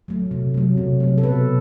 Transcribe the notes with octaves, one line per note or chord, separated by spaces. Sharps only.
F#3 A3
C3
F#3 A3
C3
F#3 A3
A4
B2 B4